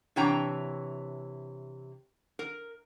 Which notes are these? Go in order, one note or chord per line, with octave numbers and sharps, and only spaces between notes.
C3 E3 D4 C#5 G5 A#5
A#4